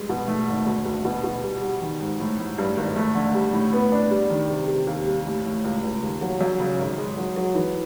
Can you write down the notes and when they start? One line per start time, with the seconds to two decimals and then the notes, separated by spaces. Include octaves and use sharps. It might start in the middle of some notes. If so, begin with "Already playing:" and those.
Already playing: G2 G#3
0.09 B2
0.28 A3
0.48 G#1
0.66 D2
0.86 D2
1.05 B2
1.24 B2
1.43 G3
1.62 G3
1.81 D#3
2.00 G#2
2.20 A2
2.39 A2
2.58 G2
2.77 G#1
2.96 A3
3.15 D3
3.35 G3
3.53 A2
3.73 B3
3.92 D4
4.11 G3
4.30 D#3
4.50 C3
4.68 C3
4.87 D#2
5.07 G3
5.26 A2
5.45 A2
5.64 C#2
5.83 C#2
6.02 D#2
6.21 F#3
6.41 F#2
6.60 C#3
6.79 G#1
6.98 G#3
7.17 F#3
7.36 F#3
7.55 E3